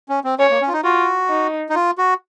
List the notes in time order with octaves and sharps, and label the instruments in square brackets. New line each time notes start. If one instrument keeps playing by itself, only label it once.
[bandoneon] C#4
C4
[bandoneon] C#4 [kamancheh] C#5
[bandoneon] A#3
C#4
F4
D#4
[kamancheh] F4 [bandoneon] F#4
[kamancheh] D#4
[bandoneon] D#4
F4
F#4